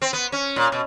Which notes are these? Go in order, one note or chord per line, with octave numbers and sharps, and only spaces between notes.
C4
B3
C#4
A#2
B2